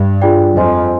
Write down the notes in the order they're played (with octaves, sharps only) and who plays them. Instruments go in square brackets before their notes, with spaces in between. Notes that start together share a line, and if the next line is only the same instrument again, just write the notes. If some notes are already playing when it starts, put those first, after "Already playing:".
Already playing: [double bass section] G2
[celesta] D4 F4 G#4 D5 G5
[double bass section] F2 [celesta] C5 D#5 G#5 C6